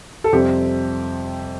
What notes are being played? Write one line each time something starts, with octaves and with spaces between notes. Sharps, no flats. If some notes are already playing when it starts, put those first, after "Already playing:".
A4
F2 C3 G3 C4 G4